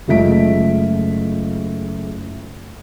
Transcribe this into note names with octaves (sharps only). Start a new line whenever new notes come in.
F#1 G#3 A3 F4 B6 D7